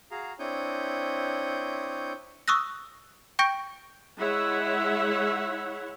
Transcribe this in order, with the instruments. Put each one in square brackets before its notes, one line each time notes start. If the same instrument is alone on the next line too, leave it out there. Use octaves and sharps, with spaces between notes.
[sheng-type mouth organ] F#4 G#4 F5 A#5
C4 D4 E4 C#5 D#6 G6
[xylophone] C#6 D#6 E6 F#6 A#6
G5 C#6 G6 A#6 D7
[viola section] G#3 E4 C#5 E5 F#5